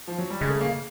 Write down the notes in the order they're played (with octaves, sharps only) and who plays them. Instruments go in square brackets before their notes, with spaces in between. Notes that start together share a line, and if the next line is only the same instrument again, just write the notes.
[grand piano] F3
F#3
G3
[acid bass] C#3 [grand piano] G#3
[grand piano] A3
A#3